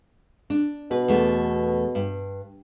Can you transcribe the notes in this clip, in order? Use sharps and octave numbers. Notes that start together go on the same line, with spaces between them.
D4
B2 B4
E2 A3
G2